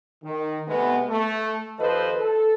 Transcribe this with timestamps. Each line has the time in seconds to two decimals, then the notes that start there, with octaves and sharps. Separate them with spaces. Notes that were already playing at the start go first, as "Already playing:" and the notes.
0.23 D#3
0.68 C3 G#3 A3 B3
1.09 A3
1.79 D#2 F3 A4 B4 C5 D#5
2.19 A4